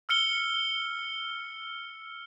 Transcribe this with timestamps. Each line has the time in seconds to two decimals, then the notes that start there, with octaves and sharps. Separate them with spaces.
0.09 E6 F6 C#7 G7